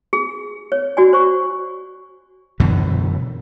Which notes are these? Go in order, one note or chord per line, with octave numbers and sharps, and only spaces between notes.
G#4
C#5
F#4 D5 G#5
C5 C#6
F#2 B2 D3 E3